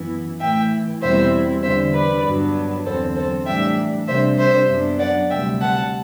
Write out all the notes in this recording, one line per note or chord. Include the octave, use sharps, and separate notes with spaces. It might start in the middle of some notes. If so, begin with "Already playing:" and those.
Already playing: F#2 E3 B3 E4
A2 E3 A3 E4 E5 G5
E2 B2 G3 C4 E4 C5 E5
E2 D3 G3 C5 E5
B4 D5
G2 F#3 B3 D4
E2 D3 F#3 C4 A4 C5
A4 C5
A2 E3 G3 D4 E5 G5
C3 G3 D4 C5 E5
C5 E5
F#2 F#3 B3 D4
D5 F#5
D2 C3 G3 E5 G5
F#5 A5